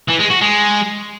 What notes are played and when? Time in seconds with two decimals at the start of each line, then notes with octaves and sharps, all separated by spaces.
0.08 E3
0.19 G#3
0.30 F#4
0.41 G#3